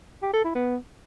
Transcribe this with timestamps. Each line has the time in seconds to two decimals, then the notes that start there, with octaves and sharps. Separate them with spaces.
0.23 G4
0.34 A4
0.44 E4
0.55 B3